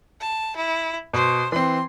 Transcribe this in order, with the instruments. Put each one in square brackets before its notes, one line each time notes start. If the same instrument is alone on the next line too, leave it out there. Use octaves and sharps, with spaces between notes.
[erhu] A5
E4
[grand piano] B2 [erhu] C5
[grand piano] E3 C4 [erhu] C6